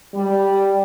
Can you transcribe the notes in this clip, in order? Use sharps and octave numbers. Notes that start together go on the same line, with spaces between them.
G3